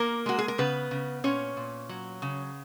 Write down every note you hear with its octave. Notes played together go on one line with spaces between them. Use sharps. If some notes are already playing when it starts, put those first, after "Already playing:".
Already playing: A#3 A#4
G#3 F#4
G#4
A#4
C#3 B3 B4
C#3
A#2 C#4 C#5
A#2
F#3
C#3